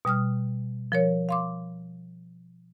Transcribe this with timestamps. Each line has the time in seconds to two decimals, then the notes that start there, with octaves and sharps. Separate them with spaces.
0.05 B2 G3 D#6 F6
0.92 F3 A#4 C#5
1.29 F5 C6 D6